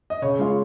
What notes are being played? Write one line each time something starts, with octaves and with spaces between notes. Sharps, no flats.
D#5
C#3 C#5
G#3 C#4 F4